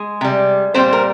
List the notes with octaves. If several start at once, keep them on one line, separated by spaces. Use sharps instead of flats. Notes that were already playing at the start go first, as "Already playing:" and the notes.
Already playing: G#3 G#4
C3 G3
A#2 G3 C4 C5
A#4